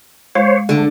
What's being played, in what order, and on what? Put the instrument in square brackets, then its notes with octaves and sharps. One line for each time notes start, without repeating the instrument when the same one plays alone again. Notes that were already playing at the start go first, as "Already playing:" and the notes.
[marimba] G#3 [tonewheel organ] C5 C#5
[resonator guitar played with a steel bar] D3 [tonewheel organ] A3